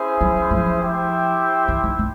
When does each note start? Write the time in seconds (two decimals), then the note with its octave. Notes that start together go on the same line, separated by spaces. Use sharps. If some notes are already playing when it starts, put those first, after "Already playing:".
Already playing: C#4 E4 G#4 C5
0.21 F#3
0.51 F3
0.80 E4 G4 C5 E5 G5
1.68 E3
1.84 D#3
1.99 D#3